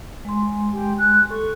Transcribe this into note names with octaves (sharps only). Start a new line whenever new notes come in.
G#3 G#5 C6
G4
F#6
A4 C#6